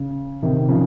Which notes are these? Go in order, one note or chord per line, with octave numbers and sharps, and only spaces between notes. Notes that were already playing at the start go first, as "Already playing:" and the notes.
Already playing: C#3
C3 D#3
C#3 F3